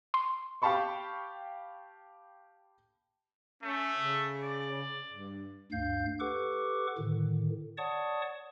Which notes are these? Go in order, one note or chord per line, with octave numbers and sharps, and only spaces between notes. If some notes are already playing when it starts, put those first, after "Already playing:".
C6
G4 F5 G5 A5 B5 C#6
A3 C#4
C#3
D5
G2
D2 G2 F5 G6
G4 A4 B4 F#5 C#6 D6
A2 D3 D#3
C#5 D5 F#5 A5 C#6 D#6